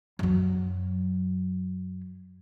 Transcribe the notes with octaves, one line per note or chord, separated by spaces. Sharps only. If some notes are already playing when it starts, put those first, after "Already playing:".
F#2 F#3